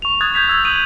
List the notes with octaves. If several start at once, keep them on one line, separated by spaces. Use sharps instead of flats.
C#6 F7
D#6 F#6 G#6 A6
G6 G#6 B6 F7
E6 G6 G#6
D#6 E6 G6 D#7 F#7